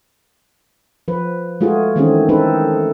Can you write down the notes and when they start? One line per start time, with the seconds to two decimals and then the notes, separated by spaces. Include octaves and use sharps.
1.08 F3 B4
1.61 G#3 A3 F4 F#4 G#4
1.96 D#3 E3 A3 C4 C#4 G#4
2.29 A3 C4 D#4 G#4 A4 B4